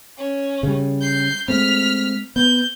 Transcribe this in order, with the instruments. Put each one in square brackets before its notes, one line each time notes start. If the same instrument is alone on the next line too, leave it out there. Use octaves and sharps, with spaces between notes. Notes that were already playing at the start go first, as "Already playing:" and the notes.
[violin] C#4
[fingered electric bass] C#3 G3
[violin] G6 C7
[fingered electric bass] G#3 A3 C4 [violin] F6 B6
[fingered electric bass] B3 [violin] G6